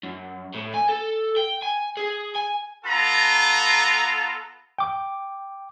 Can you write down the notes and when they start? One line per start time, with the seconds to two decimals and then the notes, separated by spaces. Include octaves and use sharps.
0.03 F#2
0.54 A2
0.74 G#5
0.89 A4
1.37 G5
1.62 G#5
1.97 G#4
2.36 G#5
2.85 B3 F4 A4 A#5
4.78 G5 D6